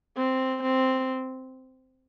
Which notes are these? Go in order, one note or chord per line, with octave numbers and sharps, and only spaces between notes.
C4
C4